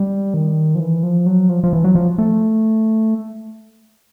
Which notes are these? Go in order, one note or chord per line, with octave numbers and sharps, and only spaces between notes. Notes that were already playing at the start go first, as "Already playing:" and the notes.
Already playing: G3
D#3
F3
E3
F3
F#3
F3
F3
E3
F#3
F3
A3